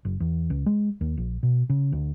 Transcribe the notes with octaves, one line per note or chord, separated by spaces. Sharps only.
F#1
E2
C#2
G#3
D#2
A#1
B2
C#3
D2